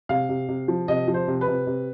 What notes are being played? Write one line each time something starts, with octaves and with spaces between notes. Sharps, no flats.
C3 F5
C3
C3
F3
C3 D#5
F3
C5
C3
B4
C3
C3